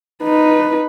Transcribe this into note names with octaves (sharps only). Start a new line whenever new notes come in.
D#4 B4